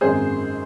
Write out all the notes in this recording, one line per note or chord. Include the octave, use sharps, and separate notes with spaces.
G#1 F#2 D#3 G#3 G#4 C5